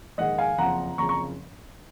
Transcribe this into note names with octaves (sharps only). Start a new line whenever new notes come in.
A#1 G#2 D#3 G#3 D#5 F#5
F5 G#5
F#1 F2 C#3 F3 F#5 A#5
F#1 F2 C#3 F3 A#5 C#6
A#5 C#6